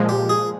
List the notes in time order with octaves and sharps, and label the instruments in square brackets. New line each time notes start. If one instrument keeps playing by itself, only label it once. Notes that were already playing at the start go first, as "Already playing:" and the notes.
Already playing: [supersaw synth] A#2 F3 G#3
[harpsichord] G4
G#4